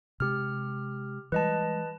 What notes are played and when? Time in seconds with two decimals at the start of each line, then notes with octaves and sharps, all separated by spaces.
0.20 C3 G#3 G4 F6
1.32 E3 G3 G#3 B4 D#5 A5